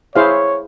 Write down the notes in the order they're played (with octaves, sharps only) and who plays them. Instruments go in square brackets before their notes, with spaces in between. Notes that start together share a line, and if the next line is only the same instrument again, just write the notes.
[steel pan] E4 G#4 C5 F5 [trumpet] C#5